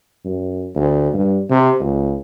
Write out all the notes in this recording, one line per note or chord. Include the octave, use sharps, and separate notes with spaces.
F#2
D2
G2
C3
C#2